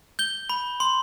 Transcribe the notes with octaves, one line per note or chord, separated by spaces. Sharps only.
G6 G7
B5
C6